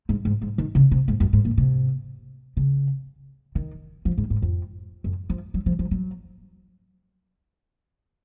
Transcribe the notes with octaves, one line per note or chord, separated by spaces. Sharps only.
G#2
G#2
G#2
D#3
C#3
C3
G#2
F#2
G#2
A#2
C3
C#3
D#3
F3
G#2
G#2
F2
F#2
F3
F#3
F3
F3
F#3